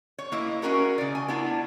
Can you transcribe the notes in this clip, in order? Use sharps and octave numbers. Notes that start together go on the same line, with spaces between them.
C#5
A#3 E4 D#5
C#4 F#4 G#4 A#4 B4 C#5
C#3 D5
G#5
B3 D4 E4 F4